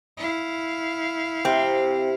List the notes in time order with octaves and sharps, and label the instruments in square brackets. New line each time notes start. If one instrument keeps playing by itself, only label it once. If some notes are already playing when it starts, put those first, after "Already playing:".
[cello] E4 F5
[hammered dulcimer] C3 [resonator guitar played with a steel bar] C4